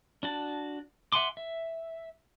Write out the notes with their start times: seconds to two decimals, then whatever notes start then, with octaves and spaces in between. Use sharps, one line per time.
0.23 D4 F#4 A5
1.12 E5 F#5 G#5 C6 D6
1.37 E5